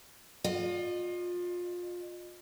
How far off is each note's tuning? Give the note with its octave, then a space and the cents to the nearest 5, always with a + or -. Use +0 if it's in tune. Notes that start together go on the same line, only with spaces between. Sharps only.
F4 +25 D#5 -30